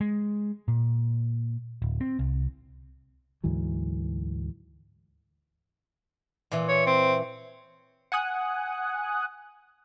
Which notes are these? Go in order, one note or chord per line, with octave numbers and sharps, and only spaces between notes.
G#3
A#2
D1
C4
C2
D2 G#2 E3 F#3
A#2 E3
C#5
C4
F#5 G#5 D#6 F#6